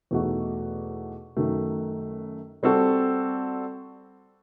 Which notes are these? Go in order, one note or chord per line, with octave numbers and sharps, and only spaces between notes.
E2 B2 A3 D#4 F#4
F#2 D#3 F#3 A3
G3 C4 F#4 A4